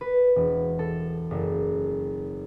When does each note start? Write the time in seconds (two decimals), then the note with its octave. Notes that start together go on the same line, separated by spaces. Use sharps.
0.01 B4
0.36 E1
0.79 A4
1.31 F#1